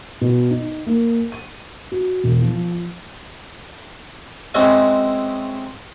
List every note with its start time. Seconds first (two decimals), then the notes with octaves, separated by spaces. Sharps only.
0.21 B2
0.51 D#4
0.87 A#3
1.32 D#7
1.92 F#4
2.24 E1
2.41 F3
4.54 G#3 C4 C#4 D#4 E4 F#4